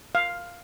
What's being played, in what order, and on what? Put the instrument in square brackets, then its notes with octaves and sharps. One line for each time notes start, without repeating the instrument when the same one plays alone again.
[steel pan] F5